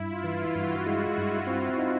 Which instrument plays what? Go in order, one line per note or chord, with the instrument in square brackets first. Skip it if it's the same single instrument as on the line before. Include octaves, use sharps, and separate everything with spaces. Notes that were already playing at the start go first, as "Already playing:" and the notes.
Already playing: [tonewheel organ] G2 [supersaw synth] E4
[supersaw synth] F4
[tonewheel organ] E3
[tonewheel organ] G2 [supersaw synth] F#4
[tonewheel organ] G#3
[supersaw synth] F4
[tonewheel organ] G2
C4
D#4